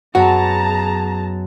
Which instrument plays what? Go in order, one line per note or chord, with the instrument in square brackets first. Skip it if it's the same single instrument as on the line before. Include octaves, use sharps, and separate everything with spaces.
[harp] F#2 B3 [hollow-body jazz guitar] F#4 [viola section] G#4 A5 A#5